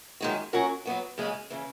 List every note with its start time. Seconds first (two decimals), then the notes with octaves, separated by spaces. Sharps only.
0.21 F#2 D#3 G#3 D#4 F#4
0.53 F#3 C#4 F#4 A#4
0.85 F#3 B3 F#4
1.18 F#2 C#3 G#3 C#4 G#4
1.50 C#3 E3